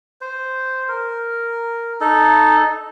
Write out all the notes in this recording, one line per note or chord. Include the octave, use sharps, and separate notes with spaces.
C5
A#4
D#4 A4